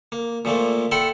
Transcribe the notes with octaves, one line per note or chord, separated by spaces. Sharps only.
A#3
A#2 F3 A3 A#3
A4 E5 F#5 G5 B5 C6